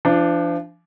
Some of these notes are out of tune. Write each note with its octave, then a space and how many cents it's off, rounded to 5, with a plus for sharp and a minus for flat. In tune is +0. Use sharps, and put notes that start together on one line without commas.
F3 -35 D4 +0